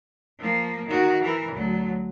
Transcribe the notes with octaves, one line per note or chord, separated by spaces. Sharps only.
F3 A#3
D#3 F#4
E3 A#4
D2 F#3